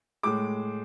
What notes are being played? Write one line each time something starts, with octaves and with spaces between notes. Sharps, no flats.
A2 G#3 D6